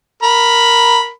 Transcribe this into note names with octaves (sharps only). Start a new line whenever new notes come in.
A#4 B5